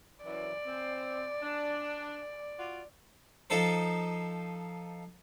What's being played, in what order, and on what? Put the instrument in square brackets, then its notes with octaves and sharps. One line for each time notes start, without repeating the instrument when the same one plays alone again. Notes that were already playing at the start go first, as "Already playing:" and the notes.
[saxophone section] F#2 E3 [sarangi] D5
[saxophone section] C4
D4
F4 F#4 D5
[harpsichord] F3 D#4 A4 C5